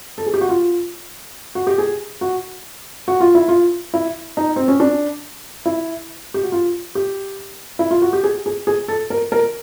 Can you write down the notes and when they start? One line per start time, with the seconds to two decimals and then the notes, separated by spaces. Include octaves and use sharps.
0.18 A4
0.26 G#4
0.34 G4
0.41 F#4
0.49 F4
1.55 F#4
1.67 G4
1.78 G#4
2.21 F#4
3.08 F#4
3.20 F4
3.35 E4
3.48 F4
3.94 E4
4.37 D#4
4.56 C4
4.68 C#4
4.80 D4
5.66 E4
6.34 G4
6.43 F#4
6.52 F4
6.95 G4
7.79 E4
7.91 F4
8.02 F#4
8.13 G4
8.23 G#4
8.46 G#4
8.67 G#4
8.88 A4
9.10 A#4
9.32 A#4